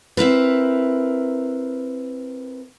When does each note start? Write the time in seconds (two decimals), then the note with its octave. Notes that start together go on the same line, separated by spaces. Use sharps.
0.17 C4 E4 A#4 B4